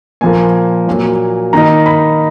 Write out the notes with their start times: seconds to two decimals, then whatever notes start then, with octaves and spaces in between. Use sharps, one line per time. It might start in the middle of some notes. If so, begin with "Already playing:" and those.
0.21 A#2 F3 A#3 G#5
0.87 A#2 F#3 A#3
1.53 D#3 A#3 D#4 A#5
1.86 B5